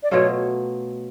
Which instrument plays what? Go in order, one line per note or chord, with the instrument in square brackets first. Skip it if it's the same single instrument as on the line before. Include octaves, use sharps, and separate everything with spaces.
[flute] D5
[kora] B2 F#3 A3 F4 [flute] C#5